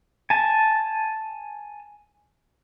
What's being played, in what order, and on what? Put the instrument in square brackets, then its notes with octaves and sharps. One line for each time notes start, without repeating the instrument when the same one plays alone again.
[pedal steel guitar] G#5 A5